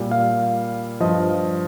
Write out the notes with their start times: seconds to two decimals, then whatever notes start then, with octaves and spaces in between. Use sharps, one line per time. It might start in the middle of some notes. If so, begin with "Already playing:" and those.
Already playing: A#2 G3
0.11 F5
1.00 G2 F3 D#5